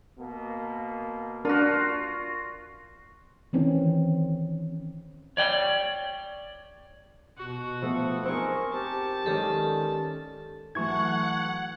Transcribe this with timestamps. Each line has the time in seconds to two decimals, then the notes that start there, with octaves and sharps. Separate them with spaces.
0.18 B2 A#3
1.45 D4 F4 F#4 A#4
3.53 D#3 E3 C4 C#4
5.37 C#5 D5 G5
7.38 B2 F#4
7.82 F3 A3 B3 A4
8.25 C4 D#4 G#4 A#4 C#6
8.72 G4 A5
9.26 D#3 G#3 C#4 G4 A4 D5
10.75 E3 F#3 A3 F#5 C#6 G#6